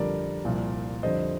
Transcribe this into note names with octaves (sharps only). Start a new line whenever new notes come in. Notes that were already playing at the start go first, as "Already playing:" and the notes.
Already playing: F2 D3 G3 A#4 D5
C2 A#2 F3
F2 D3 G3 C5 D#5